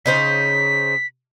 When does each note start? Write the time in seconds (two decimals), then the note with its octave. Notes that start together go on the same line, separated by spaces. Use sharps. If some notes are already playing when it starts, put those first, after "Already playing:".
0.06 C#3 D#4 C5 B6